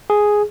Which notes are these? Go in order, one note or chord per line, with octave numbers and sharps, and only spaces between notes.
G#4